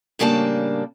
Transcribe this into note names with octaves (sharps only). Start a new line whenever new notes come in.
A2 C#3 G3 A#3 D4 A5